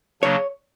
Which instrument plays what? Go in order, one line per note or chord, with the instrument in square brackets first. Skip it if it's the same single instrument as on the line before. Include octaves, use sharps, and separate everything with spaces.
[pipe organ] C#3 F#3 A#3 D4 [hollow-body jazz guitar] C#5